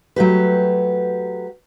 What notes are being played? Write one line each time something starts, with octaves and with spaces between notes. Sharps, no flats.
F#3 A3 G4 B4